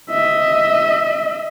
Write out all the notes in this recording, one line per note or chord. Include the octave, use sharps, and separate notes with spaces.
D#5 E5